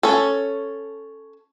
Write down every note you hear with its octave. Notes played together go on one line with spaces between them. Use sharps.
C#4 A4